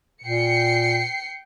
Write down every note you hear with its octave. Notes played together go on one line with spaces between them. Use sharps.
A#2 G5 C7 C#7